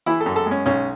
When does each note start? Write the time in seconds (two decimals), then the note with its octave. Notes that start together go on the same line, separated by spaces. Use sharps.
0.06 E3 E4
0.21 A4
0.26 F#2
0.36 A4
0.46 G#3
0.51 C#4
0.66 B1 C#4